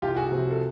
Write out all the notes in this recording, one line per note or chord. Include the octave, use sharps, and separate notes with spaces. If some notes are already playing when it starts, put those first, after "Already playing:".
C2 F4 G4
F#4 G#4
C3 F3
A4